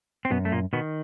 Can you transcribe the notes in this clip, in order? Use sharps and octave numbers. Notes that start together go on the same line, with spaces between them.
C4
F#2 B2 B3
A3
A#2 A#3
B2 D#3 B3